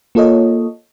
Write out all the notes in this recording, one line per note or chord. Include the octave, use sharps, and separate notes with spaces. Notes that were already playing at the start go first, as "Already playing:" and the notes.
A#3 F4 A4 C#5 D#5